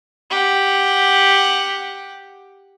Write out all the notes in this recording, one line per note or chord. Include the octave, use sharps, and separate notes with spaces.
G4 F#5